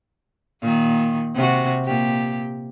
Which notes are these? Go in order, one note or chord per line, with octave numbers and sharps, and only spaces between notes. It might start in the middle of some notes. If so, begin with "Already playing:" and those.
A#2 D#3
C3 F#4
A#2 G4